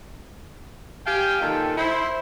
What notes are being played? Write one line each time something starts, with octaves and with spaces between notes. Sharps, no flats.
G4 F5 G5 G#5
A#2 D#3 A4
E4 C5